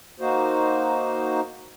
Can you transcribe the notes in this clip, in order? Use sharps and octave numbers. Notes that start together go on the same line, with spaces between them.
A#3 D#4 F#4 C5